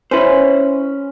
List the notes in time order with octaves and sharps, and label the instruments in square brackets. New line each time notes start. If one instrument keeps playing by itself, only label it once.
[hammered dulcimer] C#4 [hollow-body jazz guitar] E4 B4 C5